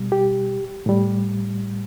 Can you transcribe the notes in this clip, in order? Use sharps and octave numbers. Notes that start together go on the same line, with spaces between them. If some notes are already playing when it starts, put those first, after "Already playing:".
Already playing: B2 G3
G4
A2 G3